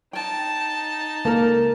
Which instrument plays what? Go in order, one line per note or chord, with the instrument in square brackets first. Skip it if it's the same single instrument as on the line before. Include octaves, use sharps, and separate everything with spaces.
[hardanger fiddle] D#4 A5 [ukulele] G5
[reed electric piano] C#2 A#3 A6 [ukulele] A4 A#4